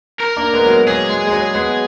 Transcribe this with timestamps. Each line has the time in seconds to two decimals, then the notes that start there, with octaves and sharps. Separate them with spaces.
0.20 A#4
0.37 A#3 D4
0.54 G#3 B3
0.66 F#3
0.70 G#3
0.87 F#3 G#4
1.09 G#3
1.27 G#3
1.32 F#3
1.54 G#3 B3
1.69 F#3